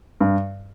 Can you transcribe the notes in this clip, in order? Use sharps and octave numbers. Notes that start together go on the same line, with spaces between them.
G2